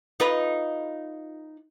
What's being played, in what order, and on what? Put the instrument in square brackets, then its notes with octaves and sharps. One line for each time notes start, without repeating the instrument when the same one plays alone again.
[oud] D#4 F4 B4